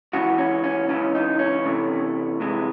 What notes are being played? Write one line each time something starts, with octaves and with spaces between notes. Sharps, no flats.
C#2 C#3 E3 F#4
C#4
C#4
C#2 C#3 E3 C#4
D#4
C#4
C2 C3 E3 A3
C2 C3 E3 G#3